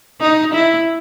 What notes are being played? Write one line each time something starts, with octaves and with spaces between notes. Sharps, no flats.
D#4
E4